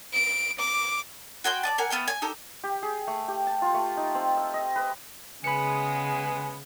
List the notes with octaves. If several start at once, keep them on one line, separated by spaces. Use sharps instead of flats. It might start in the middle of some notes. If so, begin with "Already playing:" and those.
D7
D6
F#4 G5 G#5 C6
D5 D#5 A5
A#4 F#5 G#5
A3 B3 F5 G5
G#5
D#4 G4 A4
G4
G#4
A3
G4
A5
F4
A3
D#4
C4
E6
D#5
B4
C#3 G#3 B3 G#5 B5 C#7